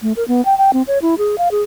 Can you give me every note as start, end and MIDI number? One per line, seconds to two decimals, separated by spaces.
0.02 0.13 57
0.16 0.26 70
0.28 0.44 59
0.45 0.57 79
0.58 0.71 79
0.73 0.82 60
0.87 0.98 73
1.02 1.15 64
1.18 1.36 68
1.38 1.49 77
1.51 1.63 68